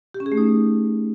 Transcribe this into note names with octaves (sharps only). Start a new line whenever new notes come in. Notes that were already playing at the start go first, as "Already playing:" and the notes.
G4
C#4
G#4
A3
D#4